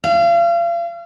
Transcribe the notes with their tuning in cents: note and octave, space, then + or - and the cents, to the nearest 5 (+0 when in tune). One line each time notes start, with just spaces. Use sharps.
F5 -35